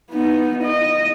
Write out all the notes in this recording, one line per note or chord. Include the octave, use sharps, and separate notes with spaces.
B3 D#4
D#5